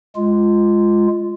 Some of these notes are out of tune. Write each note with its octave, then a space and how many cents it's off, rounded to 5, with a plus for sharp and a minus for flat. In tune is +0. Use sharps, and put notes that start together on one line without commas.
G#3 +0 F4 -10